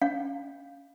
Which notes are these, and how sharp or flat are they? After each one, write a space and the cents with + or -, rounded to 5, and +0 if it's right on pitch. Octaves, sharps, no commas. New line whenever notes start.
C#4 +15 F5 +0